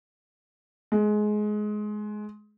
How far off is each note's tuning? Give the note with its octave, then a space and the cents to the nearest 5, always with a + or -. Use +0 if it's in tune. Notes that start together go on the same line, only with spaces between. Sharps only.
G#3 +20